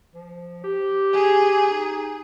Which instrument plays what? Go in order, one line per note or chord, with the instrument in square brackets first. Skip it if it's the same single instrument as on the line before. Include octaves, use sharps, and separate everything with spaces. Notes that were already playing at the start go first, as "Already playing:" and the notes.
[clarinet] F3
G4
[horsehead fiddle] G#4
[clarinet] D#4